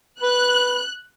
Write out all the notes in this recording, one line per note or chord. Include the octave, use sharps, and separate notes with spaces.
B4 F#6